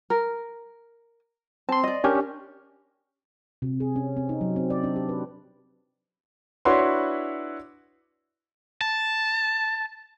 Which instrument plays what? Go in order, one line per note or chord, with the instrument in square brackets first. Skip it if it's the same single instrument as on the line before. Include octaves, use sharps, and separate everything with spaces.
[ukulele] A#4
[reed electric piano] C4 C6 [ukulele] A5
[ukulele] D5 D#5
[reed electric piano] C#4 D4 G4 [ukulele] A#4
[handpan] C3
G#4
C#4
C4
D#4
F#3
C4
D5
D4
G4
B4
[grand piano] D4 E4 F#4 B4 C#5 C6
[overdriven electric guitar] A5